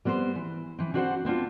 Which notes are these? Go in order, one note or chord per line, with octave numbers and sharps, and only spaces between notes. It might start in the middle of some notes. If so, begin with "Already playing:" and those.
G3 B3 C4 A#4 C5
E3
E3 C4
C4 D4 F#4 A#4 C5 F#5
B3 C4 D4 F4